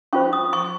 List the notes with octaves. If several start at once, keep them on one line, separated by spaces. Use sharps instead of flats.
C#4 F4 C5 C#6
D#6
C#6